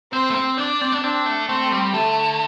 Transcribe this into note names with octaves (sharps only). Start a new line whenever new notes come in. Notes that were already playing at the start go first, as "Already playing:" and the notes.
C4 C5
A3
C4
D4 D5
C4
D4
C4 D4
A3
A3 C4
G3
D3 A3